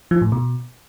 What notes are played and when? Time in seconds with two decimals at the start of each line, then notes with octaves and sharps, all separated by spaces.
0.11 F3
0.22 A2
0.32 B2